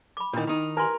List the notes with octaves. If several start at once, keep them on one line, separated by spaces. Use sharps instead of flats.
B5 D6
A#2 D#3 D4 E4
D#3 D#4
A#4 B4 G#5 C6